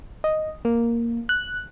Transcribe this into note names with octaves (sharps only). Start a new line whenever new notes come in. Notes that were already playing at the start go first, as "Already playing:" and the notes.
D#5
A#3
F#6